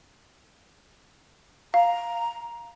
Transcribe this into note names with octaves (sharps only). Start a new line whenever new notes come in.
F5 A#5